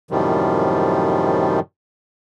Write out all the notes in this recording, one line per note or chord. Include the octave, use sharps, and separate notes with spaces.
F#2 A2 C3 D#3 F3 G3